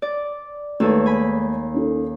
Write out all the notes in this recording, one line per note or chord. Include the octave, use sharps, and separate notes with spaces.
D5
D#2 G#3 A3 A4 B4 C#5
G#5 B5
C#4 D#4 A4